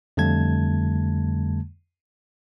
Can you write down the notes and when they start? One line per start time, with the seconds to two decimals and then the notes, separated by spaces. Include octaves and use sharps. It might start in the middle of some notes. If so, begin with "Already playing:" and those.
0.17 F2 D3 G3 A3 A5 G#6